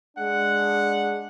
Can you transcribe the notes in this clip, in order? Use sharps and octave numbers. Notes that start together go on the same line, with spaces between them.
G#3 D4 F#5